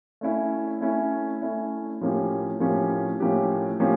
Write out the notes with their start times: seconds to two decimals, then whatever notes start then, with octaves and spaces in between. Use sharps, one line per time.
0.21 A3 C#4 E4
0.81 A3 C#4 E4
1.42 A3 C#4 E4
2.01 A2 F3 A#3 C#4 G4
2.60 A2 F3 A#3 C#4 G4
3.20 A2 F3 A#3 C#4 G4
3.80 A2 F3 A#3 C#4 G4